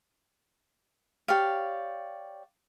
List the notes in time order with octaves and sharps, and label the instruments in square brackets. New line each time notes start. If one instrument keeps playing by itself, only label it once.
[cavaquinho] G4 C#5 D5 F5